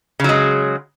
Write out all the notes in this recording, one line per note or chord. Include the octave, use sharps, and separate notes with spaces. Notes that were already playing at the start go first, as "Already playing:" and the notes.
C#3 F#3 G#3